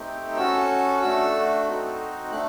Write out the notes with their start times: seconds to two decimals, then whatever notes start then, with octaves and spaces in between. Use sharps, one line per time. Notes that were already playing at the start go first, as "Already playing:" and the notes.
Already playing: A3 C4 D#4 G4
0.37 C#4 F#4 A4 E6
1.02 A3 D4 F#4 A4 E6
1.67 C4 D#4 F#4
2.32 A3 D4 F#6